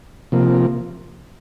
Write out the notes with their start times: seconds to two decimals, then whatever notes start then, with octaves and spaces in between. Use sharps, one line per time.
0.32 C3 F3 A#3